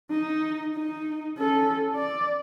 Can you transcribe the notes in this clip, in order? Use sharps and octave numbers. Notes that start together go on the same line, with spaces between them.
D#4
D#4
C#4 A4
D5